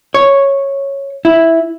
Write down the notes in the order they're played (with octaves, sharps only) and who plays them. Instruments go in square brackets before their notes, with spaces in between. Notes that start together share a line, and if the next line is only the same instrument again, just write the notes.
[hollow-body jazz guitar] C#5
E4